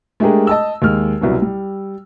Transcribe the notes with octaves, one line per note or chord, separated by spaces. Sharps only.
G#3 A3 D4 G4 G#4 A#4
D#5 A5 E6
D#2 G#3 F6
C2 B2 F#3
G3